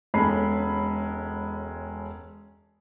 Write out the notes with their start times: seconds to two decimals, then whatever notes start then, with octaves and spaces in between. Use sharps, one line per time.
0.14 E1 G#3 C#4 A4 B5 C7